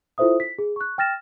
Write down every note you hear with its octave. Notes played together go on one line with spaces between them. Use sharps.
E4 F4 A4 C5 E5 D#6
B6
G#4
C#6 F#6
G5 F6 A6 A#6 E7